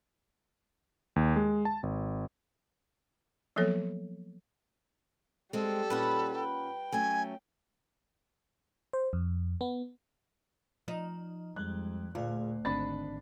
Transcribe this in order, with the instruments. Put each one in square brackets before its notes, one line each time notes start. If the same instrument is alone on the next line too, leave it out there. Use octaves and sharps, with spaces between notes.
[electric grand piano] D#2
G#3
A5
G#1
[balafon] F3 F#3 A#3 B3 A4 C#5
[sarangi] G3 [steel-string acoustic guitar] G#3 C4 [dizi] A4
[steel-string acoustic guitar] A#2 C#4 F#5 [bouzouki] B4
[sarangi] G5
[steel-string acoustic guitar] F#3 A3 C#4 [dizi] G#5
[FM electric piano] C5
F2
B3
[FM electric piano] F3 D#5 [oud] D#4
[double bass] F2 [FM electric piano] G3 G#3 [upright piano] F#6
[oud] D2 [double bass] A#2 [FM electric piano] F4 G#4 [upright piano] F5
[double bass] G#1 [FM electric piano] D3 D#3 C4 [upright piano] D4 B5 A6